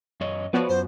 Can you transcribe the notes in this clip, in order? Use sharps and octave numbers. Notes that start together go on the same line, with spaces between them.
F#2 C#5 D#5
F3 B3 F#4 B4 C#5 D5
F#2 C5